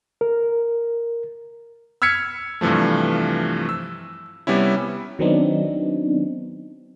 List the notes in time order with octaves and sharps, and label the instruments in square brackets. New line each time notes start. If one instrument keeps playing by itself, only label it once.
[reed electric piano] A#4
[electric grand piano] E6 F6 G#6 B6 C#7
G2 C3 E3 F3 A3
E6
C3 G3 B3 C#4 E4
[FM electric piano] D#3 F#3 B3 C4 D4 D#4